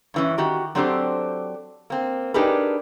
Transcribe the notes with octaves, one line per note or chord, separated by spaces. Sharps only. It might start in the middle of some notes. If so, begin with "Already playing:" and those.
G2 E3 C#4
D#3 F#4 G4
F#3 C4 D4 G4 A4 C5
A#3 C4
D4 D#4 G4 G#4 A#4 B4